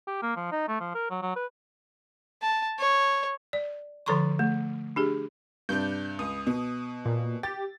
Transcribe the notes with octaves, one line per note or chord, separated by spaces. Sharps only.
G4
A#3
F3
D#4
A3
F3
A#4
F#3
F#3
B4
A5
C#5
D5
D3 F3 A4 A#5 C6 C#6
A3
D4 G4 G#4
G2 C3 D4 G6
C#2 D#6
B2
A#2
G4 A6